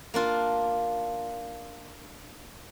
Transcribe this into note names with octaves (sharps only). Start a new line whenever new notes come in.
A#3 D4 F4